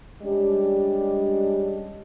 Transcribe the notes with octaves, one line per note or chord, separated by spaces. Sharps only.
G3 G#3 C#4 D4 G4